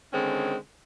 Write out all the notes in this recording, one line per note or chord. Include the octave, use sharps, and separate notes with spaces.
D3 D#3 G#3 C4 C#4